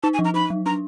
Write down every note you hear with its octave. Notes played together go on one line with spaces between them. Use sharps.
D#4 A5
G#5
F3
A#5
D#4 B5
F#3
D4 A#5